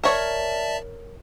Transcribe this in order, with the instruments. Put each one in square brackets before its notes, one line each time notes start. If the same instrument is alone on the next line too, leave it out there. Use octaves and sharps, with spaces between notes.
[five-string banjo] A#4 C#5 [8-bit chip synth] D5 E5 A5